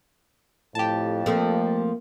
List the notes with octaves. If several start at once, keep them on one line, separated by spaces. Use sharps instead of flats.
F2 A2 G4 A5
F3 A3 A#3 C4